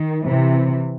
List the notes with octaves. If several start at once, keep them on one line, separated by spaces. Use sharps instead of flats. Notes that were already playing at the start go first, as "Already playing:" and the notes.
Already playing: D#3
C3 E3